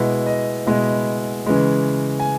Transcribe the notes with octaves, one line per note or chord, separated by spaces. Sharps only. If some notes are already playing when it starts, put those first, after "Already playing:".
Already playing: B2 G#3 B3 E4 D#5
D#5
B2 G#3 B3 E4 D#5
C#3 E3 G#3
G#5